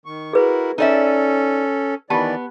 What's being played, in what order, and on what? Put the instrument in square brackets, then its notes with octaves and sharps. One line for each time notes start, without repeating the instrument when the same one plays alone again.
[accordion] D#3 C#6
[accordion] E4 F#4 A#4 [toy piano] G#4 B4
[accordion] C#4 A4 [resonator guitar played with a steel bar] D#4 D5 E5
[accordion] D#3 E3 D5 [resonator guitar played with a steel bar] B3 [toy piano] G4 A5